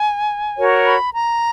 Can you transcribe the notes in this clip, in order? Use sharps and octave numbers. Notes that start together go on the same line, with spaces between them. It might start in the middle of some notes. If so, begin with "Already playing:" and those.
Already playing: G#5
F#4 A#4 C#5
B5
A#5